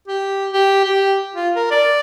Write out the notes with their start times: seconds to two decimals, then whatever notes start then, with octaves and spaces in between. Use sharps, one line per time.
0.08 G4
0.53 G4
0.85 G4
1.36 F4
1.56 A#4
1.71 D5